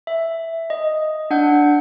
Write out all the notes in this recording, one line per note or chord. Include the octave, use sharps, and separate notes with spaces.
E5
D#5
D4 F#5 G6